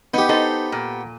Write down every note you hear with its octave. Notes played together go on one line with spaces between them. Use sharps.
B3 D#4 G4
D#4 A4 C5
A#2